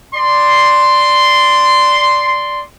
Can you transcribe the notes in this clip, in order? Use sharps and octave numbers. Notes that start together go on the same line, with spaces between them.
D5 C6